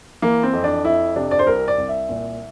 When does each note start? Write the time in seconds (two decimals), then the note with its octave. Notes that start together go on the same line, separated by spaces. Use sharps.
0.22 E3 A#3
0.43 C4
0.53 F2
0.64 D4
0.85 F2 E4
1.16 C3 D4
1.31 D5
1.39 C5
1.47 C2 A#4
1.68 D5
1.78 C2
1.88 E5
2.09 A#2